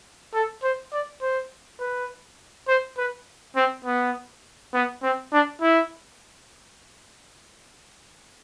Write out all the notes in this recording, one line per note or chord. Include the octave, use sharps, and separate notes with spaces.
A4
C5
D5
C5
B4
C5
B4
C4
B3
B3
C4
D4
E4